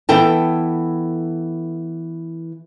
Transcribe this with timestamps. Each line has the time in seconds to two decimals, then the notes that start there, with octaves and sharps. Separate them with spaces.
0.09 E3 B3 A4 G5 A5